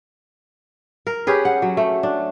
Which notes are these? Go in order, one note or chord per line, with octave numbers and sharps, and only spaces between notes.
A#4
C#4 G4 G#4 B4
F#5
F#3
A3
D4